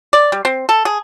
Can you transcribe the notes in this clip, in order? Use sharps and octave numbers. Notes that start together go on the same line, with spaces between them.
D5
G3
C4
A4
G#4